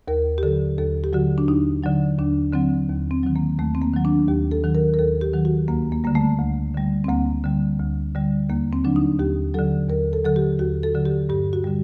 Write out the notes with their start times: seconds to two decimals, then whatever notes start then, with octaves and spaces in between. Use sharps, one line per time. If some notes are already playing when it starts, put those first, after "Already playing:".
0.08 D#2 A#4
0.38 G4
0.43 D3 F#3 A4
0.78 D#2 A4
1.04 G4
1.13 D3 F#3 F#4
1.38 D4
1.48 D#2 D#4
1.83 D3 F#3 D#4
2.19 D#2 D4
2.53 D3 F#3 C4
2.89 D#2
3.11 C4
3.23 D#3 F#3
3.36 A#3
3.58 D#2 A3
3.75 C4
3.82 A#3
3.93 D#3 F#3
4.05 D4
4.28 D#2 G4
4.51 A4
4.64 D#3 F#3
4.75 A#4
4.94 A#4
4.99 D#2 A4
5.21 G4
5.34 D#3 F#3
5.45 F#4
5.68 D2 A#3
5.92 A#3
6.04 D3 G3 A#3
6.15 A3
6.39 D2
6.74 D3 G3
7.04 C4
7.09 D2 A#3
7.44 D3 G3
7.79 D2
8.15 D3 G3
8.50 D#2 A#3
8.73 C4
8.85 D3 F#3 D4
8.96 D#4
9.19 D#2 G4
9.54 D3 F#3 A4
9.89 D#2 A#4
10.13 A4
10.24 D3 F#3 A4
10.36 G4
10.59 D#2 F#4
10.83 A4
10.94 D3 F#3
11.05 G4
11.29 G2 G4
11.53 F#4
11.64 D3 G3